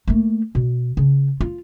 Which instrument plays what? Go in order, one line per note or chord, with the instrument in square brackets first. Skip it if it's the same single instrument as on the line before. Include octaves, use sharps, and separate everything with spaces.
[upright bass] A3 A#3
B2
C#3
F4